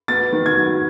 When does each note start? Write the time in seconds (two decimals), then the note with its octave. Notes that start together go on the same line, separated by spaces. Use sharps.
0.08 B3 A6
0.32 D#3
0.46 G#6
0.57 F#3